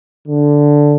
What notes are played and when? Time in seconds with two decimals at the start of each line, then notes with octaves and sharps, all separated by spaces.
0.28 D3